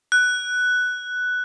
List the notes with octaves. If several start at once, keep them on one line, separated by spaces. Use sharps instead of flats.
F#6